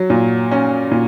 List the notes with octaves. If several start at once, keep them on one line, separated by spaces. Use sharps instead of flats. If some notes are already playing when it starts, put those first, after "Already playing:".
Already playing: F#3
A#2
C#4
A#2